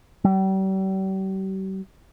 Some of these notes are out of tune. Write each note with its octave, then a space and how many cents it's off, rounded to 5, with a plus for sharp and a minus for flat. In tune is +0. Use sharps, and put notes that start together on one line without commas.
G3 -40